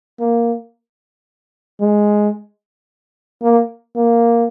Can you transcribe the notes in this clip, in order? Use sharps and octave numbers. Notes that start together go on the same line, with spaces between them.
A#3
G#3
A#3
A#3